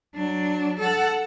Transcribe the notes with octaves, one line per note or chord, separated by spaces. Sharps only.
F#3 D4
A4 F#5